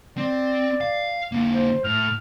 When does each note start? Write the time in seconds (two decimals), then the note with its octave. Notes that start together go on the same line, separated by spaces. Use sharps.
0.17 C4 D5
0.81 F5
1.32 D3 A#3
1.54 C5
1.84 A2 F6